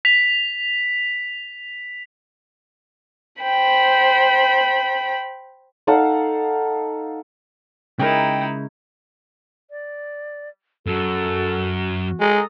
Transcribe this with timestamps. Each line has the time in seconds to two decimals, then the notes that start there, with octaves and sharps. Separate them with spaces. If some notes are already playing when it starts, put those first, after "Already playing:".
0.05 B6 F7
3.42 C5 G5 B5
5.87 D#4 A4 F5 F#5
7.99 C#3 G#3 D#4 E4 A#4 G5
9.70 D5
10.87 F#2 F#4 A4
12.21 G#3 A4 A#5 D#6